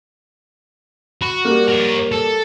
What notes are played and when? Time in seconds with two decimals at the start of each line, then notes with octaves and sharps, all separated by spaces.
1.22 F#4 B5
1.45 G3 A#3
1.68 A#4 C#5
2.12 A4